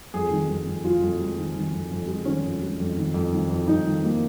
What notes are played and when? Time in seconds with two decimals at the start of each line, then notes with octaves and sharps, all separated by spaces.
0.14 F2 G#4
0.31 D#3
0.48 F2
0.66 F2
0.84 F2 F4
1.02 F2
1.20 G#3
1.37 D#3
1.56 D#3
1.72 F2
1.91 F2
2.08 G#3
2.25 D#3 C#4
2.43 F2
2.62 G#3
2.80 F2
2.97 D#3
3.14 F2
3.32 D#3
3.49 F2
3.67 F2 D#4
3.85 D#3
4.04 A#3